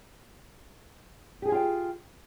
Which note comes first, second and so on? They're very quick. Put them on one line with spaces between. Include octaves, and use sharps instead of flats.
G4 G#4 G#5 F4 G5